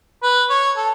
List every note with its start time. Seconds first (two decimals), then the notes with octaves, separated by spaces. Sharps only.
0.23 B4
0.50 C#5
0.77 A4